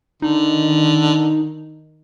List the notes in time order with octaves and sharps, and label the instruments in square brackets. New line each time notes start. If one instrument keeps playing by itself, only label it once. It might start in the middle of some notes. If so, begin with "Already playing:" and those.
[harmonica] D3 [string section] D#3 [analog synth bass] D#4